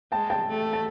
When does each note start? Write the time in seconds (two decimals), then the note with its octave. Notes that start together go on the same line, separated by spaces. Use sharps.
0.12 G#3 G5 A5
0.30 G5 A5
0.48 A3
0.73 A5